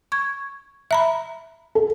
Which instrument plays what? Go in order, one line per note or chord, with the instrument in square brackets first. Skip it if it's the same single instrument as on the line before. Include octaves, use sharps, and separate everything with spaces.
[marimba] C#6 G#6
E5 A#5 B5
[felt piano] A4